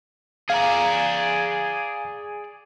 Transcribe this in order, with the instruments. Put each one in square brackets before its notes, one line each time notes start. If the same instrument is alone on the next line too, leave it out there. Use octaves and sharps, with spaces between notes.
[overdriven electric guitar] G#4 D5 [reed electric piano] F5 A#5